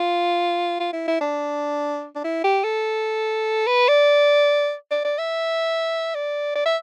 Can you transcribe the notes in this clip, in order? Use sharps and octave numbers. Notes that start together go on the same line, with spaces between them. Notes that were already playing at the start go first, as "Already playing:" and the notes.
Already playing: F4
F4
E4
E4
D4
D4
E4
G4
A4
B4
D5
D5
D5
E5
D5
D5
E5